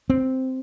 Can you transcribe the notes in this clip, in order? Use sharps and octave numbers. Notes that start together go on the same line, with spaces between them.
C4